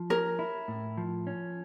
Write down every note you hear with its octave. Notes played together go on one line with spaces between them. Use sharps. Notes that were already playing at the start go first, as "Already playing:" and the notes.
Already playing: F3
C#4 A#4
E4
A2
F3
C#4